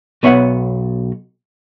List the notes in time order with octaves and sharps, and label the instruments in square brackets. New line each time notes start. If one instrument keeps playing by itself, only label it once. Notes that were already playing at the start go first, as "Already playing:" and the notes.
[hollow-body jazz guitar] B1 B3 C#5 E5 F#5